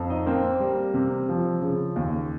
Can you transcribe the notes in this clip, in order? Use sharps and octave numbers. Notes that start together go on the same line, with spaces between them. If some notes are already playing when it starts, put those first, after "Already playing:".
Already playing: F2
D#4 D#5
A#3 C4 C5
G3
C3
F3
C#3
D#2